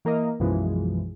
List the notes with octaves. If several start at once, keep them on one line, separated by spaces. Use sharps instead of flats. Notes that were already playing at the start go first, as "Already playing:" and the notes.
E3 A#3 A#4 D#5
B1 F#2 B2 E3 F3 G#3